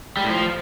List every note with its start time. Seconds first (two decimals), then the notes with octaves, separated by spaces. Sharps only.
0.17 G3
0.23 A2
0.30 F3